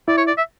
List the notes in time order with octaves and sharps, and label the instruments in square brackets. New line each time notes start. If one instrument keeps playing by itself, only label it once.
[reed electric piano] E4 [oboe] D5
[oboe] C#5
D5
E5